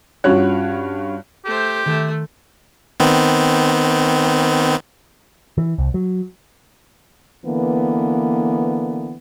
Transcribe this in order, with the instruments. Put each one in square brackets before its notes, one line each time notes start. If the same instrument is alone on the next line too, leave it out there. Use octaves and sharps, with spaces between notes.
[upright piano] G2 C#4 F4 F#4 C#5 F#6
[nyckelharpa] A3 C5 [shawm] G4
[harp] D#3 E5 G5 [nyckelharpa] A3
[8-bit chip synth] D#3 B3 C4
[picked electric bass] E3
C2
F#3
[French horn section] D3 E3 A#3 B3